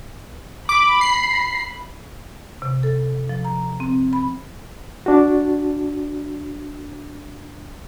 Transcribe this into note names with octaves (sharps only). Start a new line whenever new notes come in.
B5 D6
C7
C3
A4
F3
A#5
C4
B5
D4 F#4